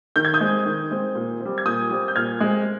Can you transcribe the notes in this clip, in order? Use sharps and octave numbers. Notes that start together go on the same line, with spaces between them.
D#3 G6
G#6
D#6 G6
G#3 C4
D#3
G#3 C4
A#2
G3 C4
G#6
A#2 D#6 G6
G3 C4
G6
A#2 F6 G#6
G#3 C4